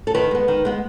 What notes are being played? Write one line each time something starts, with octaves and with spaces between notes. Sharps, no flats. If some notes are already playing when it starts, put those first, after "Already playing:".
A4
D#3 B4
G#3 B3
D#3
G#3 B3